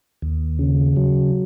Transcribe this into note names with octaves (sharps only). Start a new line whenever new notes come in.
D#2
C#3
F#3